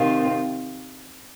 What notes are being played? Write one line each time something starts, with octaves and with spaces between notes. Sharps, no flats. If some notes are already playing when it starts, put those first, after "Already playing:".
Already playing: C3 D#3 C4 F4